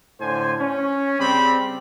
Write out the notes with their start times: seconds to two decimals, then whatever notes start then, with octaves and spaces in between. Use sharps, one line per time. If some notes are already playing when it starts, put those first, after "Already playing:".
0.20 A2 D3 C5 G#5
0.60 C#4
1.18 C#3 G3 C4 G4 B5